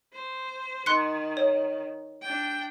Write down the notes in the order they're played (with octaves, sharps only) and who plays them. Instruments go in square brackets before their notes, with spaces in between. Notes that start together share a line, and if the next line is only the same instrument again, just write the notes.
[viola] C5
[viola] D#3 [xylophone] C6 F#6 C#7
[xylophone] C#5
[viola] D4 G5